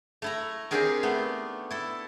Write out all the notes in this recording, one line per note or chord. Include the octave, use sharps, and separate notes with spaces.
A3 E4 A#5
C4 D4 D#4 G4 G#4 A#4
A3 B3
E4 A4